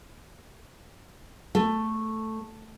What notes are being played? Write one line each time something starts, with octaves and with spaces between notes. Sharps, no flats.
A3